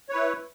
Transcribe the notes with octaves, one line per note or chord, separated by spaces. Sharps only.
E4 B4 C#5